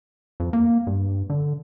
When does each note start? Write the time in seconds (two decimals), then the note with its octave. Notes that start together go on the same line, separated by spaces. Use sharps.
0.40 F2
0.53 A#3
0.87 G2
1.30 D3